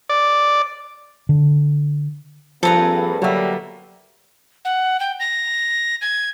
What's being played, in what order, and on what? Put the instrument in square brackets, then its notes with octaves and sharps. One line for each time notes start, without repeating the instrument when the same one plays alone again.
[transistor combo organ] D5
[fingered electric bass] D3
[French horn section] G2 A#3 [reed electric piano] F3 [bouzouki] C4 G#4 B4 [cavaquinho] A4 A#5
[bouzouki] D3 B3 [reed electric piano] F#3 F#4 E5 [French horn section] G3 A#3
[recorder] F#5
G5
A#6
G#6